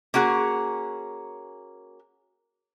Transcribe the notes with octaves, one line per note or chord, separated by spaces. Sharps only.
A#3 C#4 F#4 G#4